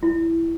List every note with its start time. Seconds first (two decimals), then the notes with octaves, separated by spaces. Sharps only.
0.03 E4